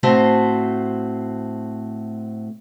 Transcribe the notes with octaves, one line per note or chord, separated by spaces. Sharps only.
A2 A3 C4 F#4 C5